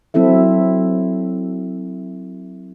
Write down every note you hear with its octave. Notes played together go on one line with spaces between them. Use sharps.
F#3 C4 E4 A4 E5